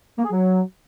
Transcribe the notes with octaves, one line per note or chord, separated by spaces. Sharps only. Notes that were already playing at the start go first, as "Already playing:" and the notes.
A#3
G#4
F#3